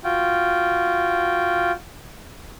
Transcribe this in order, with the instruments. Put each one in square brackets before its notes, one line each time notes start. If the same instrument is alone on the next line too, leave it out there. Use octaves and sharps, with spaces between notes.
[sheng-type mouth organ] F4 F#4 G5